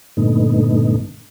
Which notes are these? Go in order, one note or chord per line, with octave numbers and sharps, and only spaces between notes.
G2 A#2 D3 A3 B3 D#4